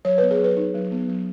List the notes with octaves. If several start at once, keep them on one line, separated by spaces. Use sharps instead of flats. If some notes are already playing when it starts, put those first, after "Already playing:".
F#3 C#5
B3 B4
G#4
F#3 B4
D#4
F#3
B3
F#3